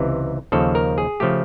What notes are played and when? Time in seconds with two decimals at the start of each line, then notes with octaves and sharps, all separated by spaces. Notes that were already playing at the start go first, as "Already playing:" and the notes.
Already playing: C#2 C3 E3
0.52 D#2 C#3 F3 A4
0.75 A#4
0.98 G#4
1.20 C#3 F3 A3 G4